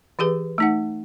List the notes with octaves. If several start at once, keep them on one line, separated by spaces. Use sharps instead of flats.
E3 G4 G#4 B4
A3 D#4 F#5